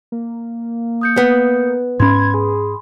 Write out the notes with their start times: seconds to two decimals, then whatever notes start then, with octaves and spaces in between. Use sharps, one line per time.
0.12 A#3
1.01 D#6 G6 C#7
1.17 B3
2.00 G#2 C#4 B5 C6 G#6
2.34 G#4